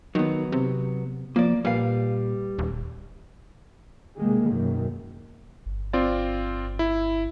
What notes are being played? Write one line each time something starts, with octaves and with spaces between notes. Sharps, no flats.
D#3 F#3 B3
C3
F3 A#3 D5
A#2 G3 B4 F5
D#1
C3 D#3 G#3 A#3
F#2 B2 D#3
G1
C4 F4 D5
E4